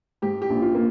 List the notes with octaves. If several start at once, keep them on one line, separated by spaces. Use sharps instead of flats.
G#2 G4
G4
A#1
F4
A#3